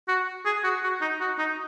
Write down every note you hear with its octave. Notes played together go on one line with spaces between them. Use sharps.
F#4
G#4
F#4
F#4
D#4
F#4
D#4